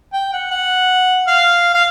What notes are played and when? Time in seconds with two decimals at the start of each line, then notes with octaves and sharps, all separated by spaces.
0.13 G5
0.33 F#5
0.51 F#5
1.28 F5
1.74 F5